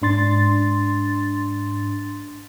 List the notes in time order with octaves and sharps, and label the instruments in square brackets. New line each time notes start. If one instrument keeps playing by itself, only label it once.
[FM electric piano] G#2 D4 C6 A6